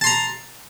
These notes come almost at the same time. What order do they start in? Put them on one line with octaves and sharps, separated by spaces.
A5 C6 A#5